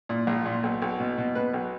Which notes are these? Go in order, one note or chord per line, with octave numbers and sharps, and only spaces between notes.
A#2
A#1
A#2
B1
B1
B2
B2
B2 B4
B1